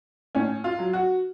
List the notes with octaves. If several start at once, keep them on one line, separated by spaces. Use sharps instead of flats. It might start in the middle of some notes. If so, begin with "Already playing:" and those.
A2 C#4
F4
F#3
F#4